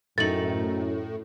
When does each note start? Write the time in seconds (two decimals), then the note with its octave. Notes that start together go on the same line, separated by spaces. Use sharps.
0.18 F#2 A2 A3 C4 D#4 A6 F#7